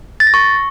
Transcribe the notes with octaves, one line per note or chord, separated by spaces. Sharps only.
A6
A#6
C#6